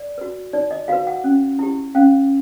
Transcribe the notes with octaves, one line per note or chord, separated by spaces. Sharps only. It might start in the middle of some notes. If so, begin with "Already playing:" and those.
Already playing: D5
F#4 B4
D#4 D5
D#5
F#4 B4 F5
F#5
C#4
E4 G4
C#4 F5